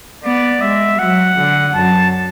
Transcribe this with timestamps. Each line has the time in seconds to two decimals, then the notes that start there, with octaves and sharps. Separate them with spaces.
0.24 B3 D5
0.62 G#3 E5
0.99 F#3 F#5
1.38 D3
1.75 F#2 A5